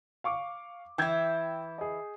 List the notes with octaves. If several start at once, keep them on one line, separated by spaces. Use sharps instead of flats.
F5 C#6 D6
E3 E4 G5 G6 G#6
G#4 D#5